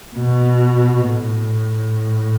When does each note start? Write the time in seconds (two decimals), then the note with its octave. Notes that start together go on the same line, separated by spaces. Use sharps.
0.16 B2
1.10 A2